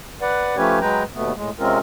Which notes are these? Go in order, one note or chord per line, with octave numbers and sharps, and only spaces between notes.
B4 D5 F#5
F3 A3 C#4 G4 B4 C#5
F#3 G#3 B4 G5 A#5
D#2 B2 A3 B3
A2 G#3
C3 G#3 C4 C#4 F4 A#4